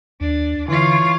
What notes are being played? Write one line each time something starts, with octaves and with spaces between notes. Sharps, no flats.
D#2 D4
D3 E3 F4 C#5 F5